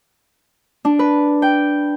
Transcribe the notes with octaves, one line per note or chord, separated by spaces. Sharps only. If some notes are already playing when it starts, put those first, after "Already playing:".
D4
B4
G5